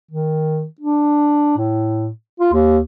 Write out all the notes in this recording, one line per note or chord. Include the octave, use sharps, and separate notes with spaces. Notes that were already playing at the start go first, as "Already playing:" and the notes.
D#3
D4
A2
F4
D#2